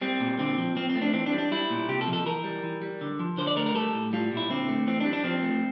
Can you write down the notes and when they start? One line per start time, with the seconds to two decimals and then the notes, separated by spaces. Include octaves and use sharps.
0.01 G3 C4
0.20 A#2
0.39 D3 C4
0.58 F3
0.76 F3 C4
0.90 C4
0.95 A3
1.02 D4
1.13 E3 C4
1.26 D4
1.32 G3
1.38 D4
1.51 G3 E4
1.70 A#2
1.88 C3 G4
2.01 A4
2.08 F3
2.13 A4
2.26 E3 A#4
2.44 G3
2.63 E3
2.82 G3
3.01 D3
3.19 F3
3.38 D3 C5
3.47 D5
3.56 A3 A#4
3.66 A#4
3.74 G3 A4
3.94 A2
4.13 G3 F4
4.32 A#2
4.37 E4
4.50 D3 C4
4.69 A3
4.87 E3 C4
5.00 D4
5.05 G3
5.13 D4
5.24 F3 C4
5.43 A3